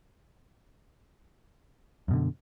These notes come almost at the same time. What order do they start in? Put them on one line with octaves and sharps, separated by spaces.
F#2 B2 D3